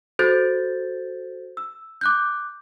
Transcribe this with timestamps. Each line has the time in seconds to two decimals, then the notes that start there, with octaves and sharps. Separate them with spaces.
0.19 F#4 A4 C5 G6 A6
1.57 E6
2.01 D6 F#6 G6